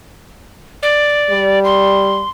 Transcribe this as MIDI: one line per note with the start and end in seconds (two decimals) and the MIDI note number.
0.83 1.59 74
1.30 2.23 55
1.64 2.29 84